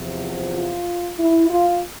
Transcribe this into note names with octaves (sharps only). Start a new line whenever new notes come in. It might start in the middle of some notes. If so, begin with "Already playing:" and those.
Already playing: E2 C3 F3
F4
E4
F4